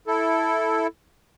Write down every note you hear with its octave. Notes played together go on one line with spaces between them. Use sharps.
E4 A4